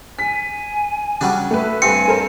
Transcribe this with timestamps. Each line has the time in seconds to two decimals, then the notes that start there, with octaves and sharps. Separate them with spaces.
0.19 G#5 B6
1.21 C#3 F#3 G3 D4
1.51 A3 B4 E5
1.82 G2 C4 G#5 C#7
2.08 A4 A#4 C5